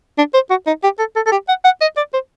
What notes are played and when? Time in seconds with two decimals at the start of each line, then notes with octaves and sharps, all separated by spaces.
0.18 D4
0.34 C5
0.50 F#4
0.67 D#4
0.83 G4
0.99 A4
1.16 A4
1.26 A4
1.32 G4
1.48 F#5
1.65 F#5
1.81 D#5
1.97 D5
2.14 C5